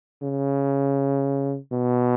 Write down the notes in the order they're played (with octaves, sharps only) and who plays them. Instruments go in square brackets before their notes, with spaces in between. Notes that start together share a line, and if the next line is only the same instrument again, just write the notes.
[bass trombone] C#3
B2